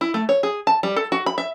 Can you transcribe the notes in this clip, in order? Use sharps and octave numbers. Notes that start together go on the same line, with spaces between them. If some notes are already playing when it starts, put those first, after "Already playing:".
E4
A3
C#5
G#4
A5
G3
A4
F#4
B5
E5